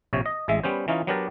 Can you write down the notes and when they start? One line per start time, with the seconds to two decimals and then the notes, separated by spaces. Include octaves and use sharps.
0.13 A#1 C3 C#5
0.26 D#5
0.48 A1 G#3 E5
0.64 G3 B3 C#4 C5
0.88 E3 C#4 D#4 F4
1.07 F#3 B3 D4 G4 A#4 D5